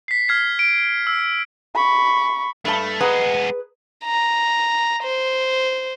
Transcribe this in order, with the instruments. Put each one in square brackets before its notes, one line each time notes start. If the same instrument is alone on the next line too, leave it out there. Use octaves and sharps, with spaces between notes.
[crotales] B6 C7
F6 G#6 C7
D7
E6
[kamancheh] B5 C#6
[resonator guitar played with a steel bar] G2 A5 [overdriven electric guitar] A3
[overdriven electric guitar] G#3 B3 [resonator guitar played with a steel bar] G#4 B4 A#5
[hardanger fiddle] A#5
C5